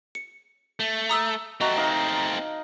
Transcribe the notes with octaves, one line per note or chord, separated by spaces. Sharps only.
C#7
A3
A#5 D#6 E6
A3 C4 F#4 D#5 A#5
D#4 F5